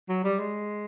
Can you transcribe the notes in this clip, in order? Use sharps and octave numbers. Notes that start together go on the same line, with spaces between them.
F#3
G3
G#3